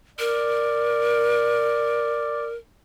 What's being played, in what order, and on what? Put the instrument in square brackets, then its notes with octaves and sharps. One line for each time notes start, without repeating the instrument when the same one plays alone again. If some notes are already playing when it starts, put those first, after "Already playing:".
[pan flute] A#4 [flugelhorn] D5